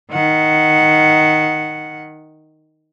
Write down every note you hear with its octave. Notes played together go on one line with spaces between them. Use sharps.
D#3 F#5